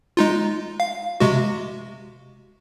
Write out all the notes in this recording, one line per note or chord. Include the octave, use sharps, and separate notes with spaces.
G#3 D#4 F4
F5
C3 G#3 F#4